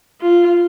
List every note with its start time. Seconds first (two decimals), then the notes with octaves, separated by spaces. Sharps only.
0.21 F4